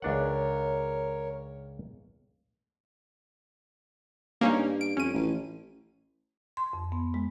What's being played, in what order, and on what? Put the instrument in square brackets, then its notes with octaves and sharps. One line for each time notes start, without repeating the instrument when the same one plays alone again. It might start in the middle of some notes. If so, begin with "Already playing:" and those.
[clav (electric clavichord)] C#2 D4 F#5 [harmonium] A#4 C#5
[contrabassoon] G2 [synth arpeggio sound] A#3 C#4 D#4
[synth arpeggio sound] D7
[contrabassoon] F2 [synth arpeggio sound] C#4 D#7
[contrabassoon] A1
[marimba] C6
F2
B3
G#3